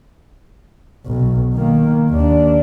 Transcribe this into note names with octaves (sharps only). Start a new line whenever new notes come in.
B1
D#3 A#3
D#2 D4